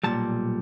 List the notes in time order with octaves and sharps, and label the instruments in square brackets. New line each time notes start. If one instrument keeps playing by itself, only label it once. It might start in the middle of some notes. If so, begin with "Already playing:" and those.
[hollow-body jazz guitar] B1 A#2 G3 A5